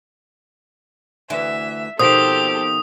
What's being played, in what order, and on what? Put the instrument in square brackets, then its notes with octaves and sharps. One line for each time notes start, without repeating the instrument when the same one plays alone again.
[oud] D2 E3 [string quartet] E5
[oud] B2 D#3 F3 [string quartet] C4 G4 A4 [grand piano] C5 [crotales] D#6